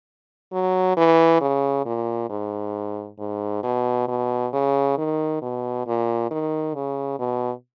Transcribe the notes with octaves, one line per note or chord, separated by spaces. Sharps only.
F#3
E3
C#3
A#2
G#2
G#2
B2
B2
C#3
D#3
B2
A#2
D#3
C#3
B2